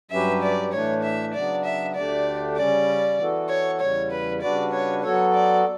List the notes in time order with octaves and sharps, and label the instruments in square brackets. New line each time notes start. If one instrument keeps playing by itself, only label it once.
[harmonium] G2 F#3 C#4 G4 B4 [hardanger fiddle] E5
[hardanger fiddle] D5
[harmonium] A2 E3 A3 D4 [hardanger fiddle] C#5
[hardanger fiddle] E5
[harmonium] C#3 F#3 B3 D4 [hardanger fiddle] D5
[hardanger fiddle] E5
[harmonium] D2 D3 A3 D4 G4 [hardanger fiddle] D5
[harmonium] C#3 G3 C#4 [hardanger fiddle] D5
[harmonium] E3 B3 F#4 A4
[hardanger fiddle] C#5
[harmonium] E2 C#3 G3 [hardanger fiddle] C#5
[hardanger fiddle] B4
[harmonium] C#3 G3 D4 F#4 B4 [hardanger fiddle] D5
[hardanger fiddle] C#5
[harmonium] F#3 B3 F#4 A4 [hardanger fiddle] C#5
[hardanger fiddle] D5